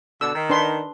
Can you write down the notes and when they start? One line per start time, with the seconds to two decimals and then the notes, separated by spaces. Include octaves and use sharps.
0.21 B2 D3 D4 E6
0.35 D#3
0.50 D4 B4 C6